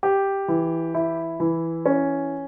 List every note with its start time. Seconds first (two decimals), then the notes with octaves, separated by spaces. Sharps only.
0.03 G4
0.48 E3
0.94 E4
1.40 E3
1.86 C#4